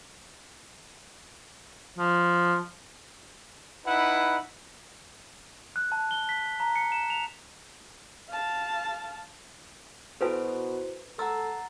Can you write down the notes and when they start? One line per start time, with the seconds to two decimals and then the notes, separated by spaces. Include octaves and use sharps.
1.98 F3
3.86 D#4 E4 B4 F#5
5.76 F#6
5.92 A5
6.11 G7
6.29 B6
6.60 A#5
6.76 C#7
6.92 E7
7.10 F7
8.29 F5 A5
10.21 B2 E4 F#4 A4 B4 C5 G#5
11.19 A4 F#5 A#5 E6 A6